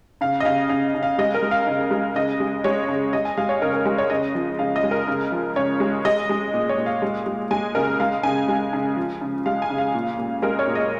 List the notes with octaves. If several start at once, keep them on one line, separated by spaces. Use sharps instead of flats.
C#3 F5
D#5
C#3 F5
C#3 F5
C#3
F5
G#3 D#5
A#4
G#3
F5
C#3
G#3
C#3 D#5
G#3
G#3 C#5
C#3
G#3 D#5
G#5
G#3 F5
C#5
C#3 A#4
A#4
G#3 A#4
C#5
C#3 D#5
F3
C#3 F5
D#5
G#3
A#4
C#3
F3
C#3 C#5
G#3
G#3 D#5
G#3
A#2
C#5
A#2
F5
G#3
G#3
G#3 G#5
C#3 A#4
G#3 F5
C#3 G#5
G#3
C#3
F3
C#3
G#3 F5
G#5
C#3
F5
A#2
A#2
G#3 A#4
C#5
A#2
D#5